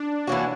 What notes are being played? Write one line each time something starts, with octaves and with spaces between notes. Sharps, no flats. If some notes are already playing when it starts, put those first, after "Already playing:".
Already playing: D4
E3 A#3 C#4 F#4